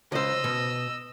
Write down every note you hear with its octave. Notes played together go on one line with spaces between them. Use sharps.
C#2 C5 D#5 E6
B2